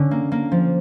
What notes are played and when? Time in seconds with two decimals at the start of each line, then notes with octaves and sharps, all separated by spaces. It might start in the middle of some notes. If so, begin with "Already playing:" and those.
Already playing: D3 C#4
0.11 A#3
0.32 A#3
0.52 F3